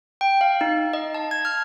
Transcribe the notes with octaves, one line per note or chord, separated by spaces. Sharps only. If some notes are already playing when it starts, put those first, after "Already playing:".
G5
F5
D#4
D#5
A5
G#6
F6